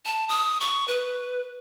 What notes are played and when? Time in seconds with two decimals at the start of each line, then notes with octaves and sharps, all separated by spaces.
0.05 A5
0.29 D#6
0.61 C#6
0.88 B4